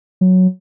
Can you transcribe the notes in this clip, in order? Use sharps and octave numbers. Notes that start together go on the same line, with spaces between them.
F#3